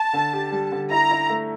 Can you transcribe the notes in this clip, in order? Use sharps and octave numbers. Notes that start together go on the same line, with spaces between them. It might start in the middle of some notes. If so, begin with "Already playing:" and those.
Already playing: A5
D3
G4
G3
D3
E4 A#5
E4
A3